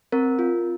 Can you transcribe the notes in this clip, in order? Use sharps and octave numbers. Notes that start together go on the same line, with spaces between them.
C4 A#4
F4